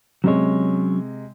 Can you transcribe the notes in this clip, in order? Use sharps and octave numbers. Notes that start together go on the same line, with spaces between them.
C3 F#3 G#3 C#4 C#5